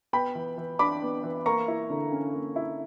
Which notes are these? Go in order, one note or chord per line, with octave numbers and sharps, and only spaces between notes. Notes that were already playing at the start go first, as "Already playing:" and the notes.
B3 G5 B5
E3
E3
D4 B5 D6
B3
E3
A#3 A#5 C#6
E4
D3
C#4
A#3
E4